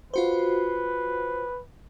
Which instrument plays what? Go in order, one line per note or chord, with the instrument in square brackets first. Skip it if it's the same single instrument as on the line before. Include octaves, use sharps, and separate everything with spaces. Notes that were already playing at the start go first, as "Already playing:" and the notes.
[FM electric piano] F4 F#4 C5 [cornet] B4